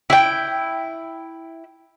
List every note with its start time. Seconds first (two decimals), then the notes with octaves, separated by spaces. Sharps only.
0.10 E4 G5